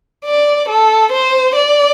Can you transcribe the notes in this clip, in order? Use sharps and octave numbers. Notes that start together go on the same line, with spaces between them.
D5
A4
C5
D5